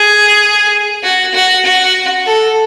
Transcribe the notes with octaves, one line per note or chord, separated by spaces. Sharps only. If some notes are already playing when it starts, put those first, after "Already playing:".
Already playing: G#4
F#4
F#4
F#4
A4